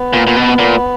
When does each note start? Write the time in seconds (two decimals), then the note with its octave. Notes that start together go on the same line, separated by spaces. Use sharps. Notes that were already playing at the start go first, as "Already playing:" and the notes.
Already playing: B3
0.13 A#2
0.27 A#2
0.36 B2
0.59 A#2